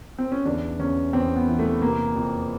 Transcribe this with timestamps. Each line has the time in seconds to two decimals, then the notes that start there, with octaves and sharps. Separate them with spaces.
0.19 C4
0.32 C#4
0.46 E2 D4
0.80 E2 C#4
1.13 E2 C4
1.36 B3
1.48 E3
1.59 A3
1.81 C3 A#3
2.16 F2